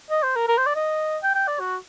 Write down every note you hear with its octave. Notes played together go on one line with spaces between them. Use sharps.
D#5
C5
A#4
A#4
C5
D5
D#5
G5
G5
D5
F#4